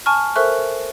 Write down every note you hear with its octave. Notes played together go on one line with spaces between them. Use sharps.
G#5 A5 C#6 F6
A4 A#4 C5 E5 C#6 F#6